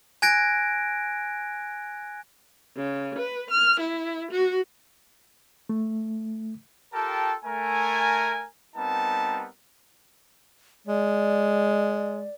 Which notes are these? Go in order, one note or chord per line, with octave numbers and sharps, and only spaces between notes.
G#5 F#6 G#6 A#6 D7
C#3
B4
F6
E4
F#4
A3
F4 G4 A4 A#4 G5 A5
A3 A#4 G#5
G3 B3 C4 D#4 A#4 A5
G#3 D5